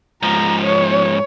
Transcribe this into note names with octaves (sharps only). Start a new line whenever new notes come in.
G#2 F3 A#5
C#5